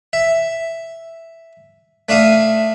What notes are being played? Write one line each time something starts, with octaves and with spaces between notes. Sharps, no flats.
E5
A3 D4 E5 F5 D#6